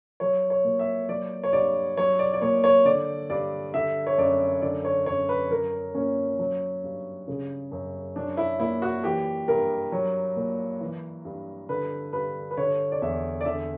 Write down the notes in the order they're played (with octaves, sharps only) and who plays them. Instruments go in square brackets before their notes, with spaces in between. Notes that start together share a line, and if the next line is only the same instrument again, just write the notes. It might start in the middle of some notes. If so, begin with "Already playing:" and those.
[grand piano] F#3 C#5
C#5
A#2
E5
F#3 D5
C#5
G2 D5
F#3 C#5
D5
D5
A#2 C#5
C#5
D3 D5
G2 D5
D3 E5
C#5
F#2 D5
D3 D5
C#5
F#2 C#5
B4
F#3 A#4
A#2 C#4
F#3
G2
C#3
F#2
F#3 D4
E4
A#2 E4
F#4
E3 G4
G2 A#4
F#3
A#2
E3
G2
D3 B4
G2 B4
B4
D3 C#5
D5
E2 E5
D5
D3 E5